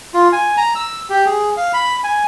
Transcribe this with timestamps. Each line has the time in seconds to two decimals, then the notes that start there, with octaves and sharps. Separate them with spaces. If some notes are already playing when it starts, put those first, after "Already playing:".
0.14 F4
0.32 G#5
0.57 A#5
0.75 E6
1.10 G4
1.26 G#4
1.57 F5
1.73 B5
2.04 G#5